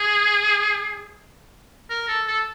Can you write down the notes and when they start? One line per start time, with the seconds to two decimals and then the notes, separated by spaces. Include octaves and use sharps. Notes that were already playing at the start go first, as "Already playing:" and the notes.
Already playing: G#4
1.90 A#4
2.08 A4
2.27 A4